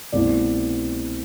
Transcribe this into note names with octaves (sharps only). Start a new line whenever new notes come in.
C2 B2 A3 C4 D5